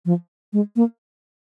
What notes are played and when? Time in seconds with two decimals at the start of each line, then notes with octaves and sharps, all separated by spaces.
0.06 F3
0.53 G#3
0.76 A#3